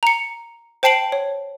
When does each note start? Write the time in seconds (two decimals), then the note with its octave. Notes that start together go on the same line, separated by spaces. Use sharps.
0.03 A#5 C#7
0.83 C5 G5 A5 C7 D7 F#7
1.12 C#5